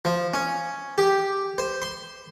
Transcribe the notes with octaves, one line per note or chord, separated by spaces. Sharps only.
F3
C#4
G4
C5
C6